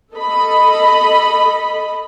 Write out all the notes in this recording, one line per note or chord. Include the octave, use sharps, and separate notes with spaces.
A4 D#5 B5